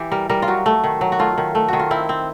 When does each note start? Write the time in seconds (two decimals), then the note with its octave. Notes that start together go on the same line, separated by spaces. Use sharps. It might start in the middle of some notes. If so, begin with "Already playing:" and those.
Already playing: E3 G4
0.12 G3 A#4
0.30 G3 A#4
0.42 F4
0.48 F#3 F#4
0.66 A3
0.84 D#3
1.01 F#3
1.12 F#4
1.19 A3 F4
1.38 D#3
1.55 A3
1.68 D#3 F#4
1.79 F4
1.91 C4 E4
2.09 C4